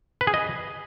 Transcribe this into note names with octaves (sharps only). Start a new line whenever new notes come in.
B4
G#4
D#5